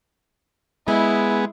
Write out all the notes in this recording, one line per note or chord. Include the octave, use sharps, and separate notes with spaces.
G#3 B3 E4 G#4